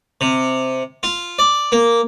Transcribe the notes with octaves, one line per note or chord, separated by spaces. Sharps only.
C3
F4
D5
A#3